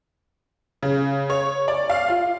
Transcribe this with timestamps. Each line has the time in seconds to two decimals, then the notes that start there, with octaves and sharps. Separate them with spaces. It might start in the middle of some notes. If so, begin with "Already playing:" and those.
0.83 C#3
1.30 C#5
1.68 D5
1.90 F5
2.08 F4